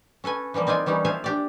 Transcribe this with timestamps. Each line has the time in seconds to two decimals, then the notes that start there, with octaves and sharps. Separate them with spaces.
0.24 C#4 A4 B4 G#5
0.54 E3 F3 G3 A#3
0.67 C4 D#4 F4 D5 G#5
0.86 E3 G3 C#4 D#4
1.05 F3 F4 C5 E5 F5 G#5
1.24 D4 G4 D5